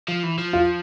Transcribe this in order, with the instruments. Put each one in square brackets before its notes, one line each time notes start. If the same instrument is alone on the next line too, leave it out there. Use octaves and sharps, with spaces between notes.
[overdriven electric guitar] F3
E3
F3
[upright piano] F4